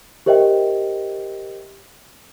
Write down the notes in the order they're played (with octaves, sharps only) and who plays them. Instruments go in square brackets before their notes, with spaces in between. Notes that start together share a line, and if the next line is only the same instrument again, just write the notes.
[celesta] G4 A#4 C5 D#5 E5 G5